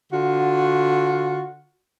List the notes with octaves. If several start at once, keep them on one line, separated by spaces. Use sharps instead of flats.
D3 F4 F#4